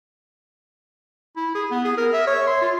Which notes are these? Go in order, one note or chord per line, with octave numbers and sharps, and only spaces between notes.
E4
G#4
B3
G#4
A#4
E5
C#5
C6
F4